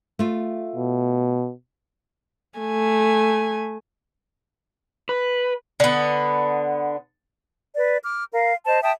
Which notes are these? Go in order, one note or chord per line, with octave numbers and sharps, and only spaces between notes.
A3 F4
B2
A3 G#5
B4
D3 B3
B4 D5
D6 F6
A#4 F5
C5 D#5 A5
E5 G5 A5 D#6